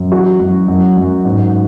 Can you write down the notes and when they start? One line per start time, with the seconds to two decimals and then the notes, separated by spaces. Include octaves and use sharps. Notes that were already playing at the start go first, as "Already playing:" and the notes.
Already playing: F#2
0.12 E3 F#4
0.39 F#2
0.68 F#2
0.97 F#2
1.25 G#2